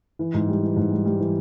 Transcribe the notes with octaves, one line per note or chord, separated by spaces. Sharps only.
E3
G#2
G3
E3
G#2
G3
G3
E3